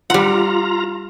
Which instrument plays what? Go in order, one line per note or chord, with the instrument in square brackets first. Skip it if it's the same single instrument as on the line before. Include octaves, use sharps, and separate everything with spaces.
[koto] G3 F#5 [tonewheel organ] F4 A#5